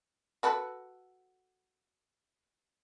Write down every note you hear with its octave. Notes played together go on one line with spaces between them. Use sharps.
F#4 A4 B4